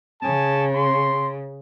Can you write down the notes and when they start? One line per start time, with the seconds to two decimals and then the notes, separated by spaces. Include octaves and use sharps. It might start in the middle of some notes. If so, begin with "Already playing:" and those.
0.22 C#3 G#4 G#5 A5
0.75 C6